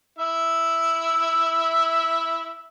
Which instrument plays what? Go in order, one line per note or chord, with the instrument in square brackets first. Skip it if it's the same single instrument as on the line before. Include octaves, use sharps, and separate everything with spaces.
[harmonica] E4 E5